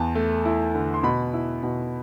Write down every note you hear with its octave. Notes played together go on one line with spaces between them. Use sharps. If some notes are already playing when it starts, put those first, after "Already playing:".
Already playing: E2 A5
A3
E4
D3
C6
B2 B5
E4
B2